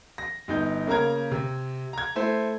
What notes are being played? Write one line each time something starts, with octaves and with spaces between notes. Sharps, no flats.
A#6
G1 D#4 G6
C#3 A#3 A#4 A#5 G#6
C3
A#5 G#6
A3 E4 C5